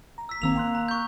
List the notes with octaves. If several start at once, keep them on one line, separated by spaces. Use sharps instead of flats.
A#5
E6 B6
G1 D#3 A#3 C4 A#5 E6 F7
G5 C6 F#6
A#5
C#6 G6